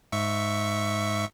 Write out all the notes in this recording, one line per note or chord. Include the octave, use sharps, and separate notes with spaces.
G#2 E5 C#6